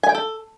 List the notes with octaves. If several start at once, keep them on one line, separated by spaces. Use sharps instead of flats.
G#5
G5
A4